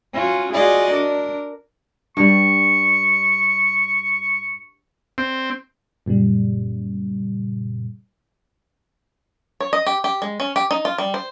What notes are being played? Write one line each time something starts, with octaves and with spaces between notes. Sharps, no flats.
C#4 F4 F#4
F4 F#4 G#4 D5 D#5
D4 A#4
G2 G3 C#6
C4
F#2 A#2 C#3 G3
C#5
D#5
G4
G4
G#3
C#4
G4
D#4
F4
G3
C5